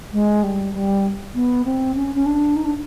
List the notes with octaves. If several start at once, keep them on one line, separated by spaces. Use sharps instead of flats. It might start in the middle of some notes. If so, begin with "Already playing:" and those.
G#3
G3
G3
B3
C4
C#4
C#4
D4
D#4
D4